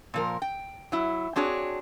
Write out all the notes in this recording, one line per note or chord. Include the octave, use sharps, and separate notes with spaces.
A#2 F3 A#4
G5
F#3 E4
C4 D4 F#4 G#4 C#5